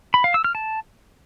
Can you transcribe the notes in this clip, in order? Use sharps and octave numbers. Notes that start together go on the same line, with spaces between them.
B5
F5
E6
F6
A5